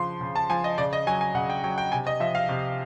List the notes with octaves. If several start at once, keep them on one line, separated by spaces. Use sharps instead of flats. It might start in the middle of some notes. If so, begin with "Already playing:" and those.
Already playing: C#3 F3 C6
C#3
A5
F3 G#5
D#5
C#3 D5
D#5
F#3 G#5
G#5
C#3 F#5
G5
F#3 G5
G5
C3 G#5
D#5
F3 E5
F5
C3